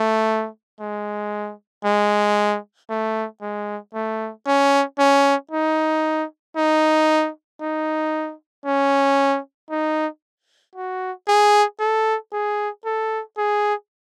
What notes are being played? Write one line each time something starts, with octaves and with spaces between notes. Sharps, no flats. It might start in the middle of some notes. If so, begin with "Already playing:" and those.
Already playing: A3
G#3
G#3
A3
G#3
A3
C#4
C#4
D#4
D#4
D#4
C#4
D#4
F#4
G#4
A4
G#4
A4
G#4